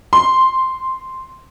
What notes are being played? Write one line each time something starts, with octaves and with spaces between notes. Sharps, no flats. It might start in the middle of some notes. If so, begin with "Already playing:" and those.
C6